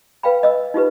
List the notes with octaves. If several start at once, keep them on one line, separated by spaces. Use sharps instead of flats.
B4 F5 G5 B5
D#5 E6
D#4 F4 G4 B4